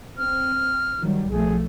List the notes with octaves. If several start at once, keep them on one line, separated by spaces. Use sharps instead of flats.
C4 F6
D#3 F#3 G3
B1 F3 A3 G#4